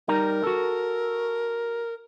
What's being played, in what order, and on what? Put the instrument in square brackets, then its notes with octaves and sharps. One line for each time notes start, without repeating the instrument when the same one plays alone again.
[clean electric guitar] G3 D#4 A#5 [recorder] A#4
[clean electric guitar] F#4 A4